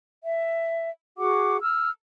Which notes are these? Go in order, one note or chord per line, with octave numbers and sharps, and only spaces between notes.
E5
F#4 G#4 F#5 D6
E6 F6